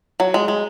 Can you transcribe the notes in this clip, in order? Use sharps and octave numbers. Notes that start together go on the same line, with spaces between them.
F#3
G#3
G#3